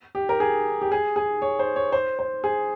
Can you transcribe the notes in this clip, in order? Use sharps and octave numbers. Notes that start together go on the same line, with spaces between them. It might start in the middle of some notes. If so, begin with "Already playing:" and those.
G4
A#4
G#4
G4
G#4
G#4
C#5
C5
C#5
C5
C5
G#4